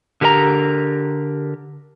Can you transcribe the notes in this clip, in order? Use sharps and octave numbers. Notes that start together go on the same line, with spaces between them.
D3 G4 A#4 C#5 A#5